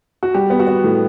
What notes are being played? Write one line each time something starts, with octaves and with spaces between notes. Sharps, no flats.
F#4
G3 G4
B3
F#4
B3
A2